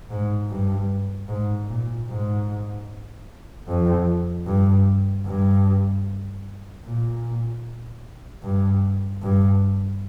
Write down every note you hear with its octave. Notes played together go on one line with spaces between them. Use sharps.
G#2
G2
G#2
A#2
G#2
F2
G2
G2
A#2
G2
G2